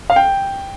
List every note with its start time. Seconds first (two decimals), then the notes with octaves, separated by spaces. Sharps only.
0.10 F5
0.16 G5